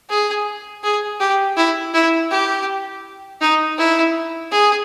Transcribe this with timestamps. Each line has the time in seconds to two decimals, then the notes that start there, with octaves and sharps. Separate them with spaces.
0.09 G#4
0.84 G#4
1.20 G4
1.57 E4
1.94 E4
2.31 G4
3.41 D#4
3.78 E4
4.51 G#4